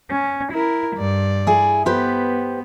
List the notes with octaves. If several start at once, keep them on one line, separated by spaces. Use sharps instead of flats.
C#4
E4 A#4
G2 D5
E4 G#4
B3 G4 B4 C5